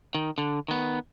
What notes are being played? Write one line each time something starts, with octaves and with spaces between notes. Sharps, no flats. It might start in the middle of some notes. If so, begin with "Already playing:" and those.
D#3
D3
D#3 B3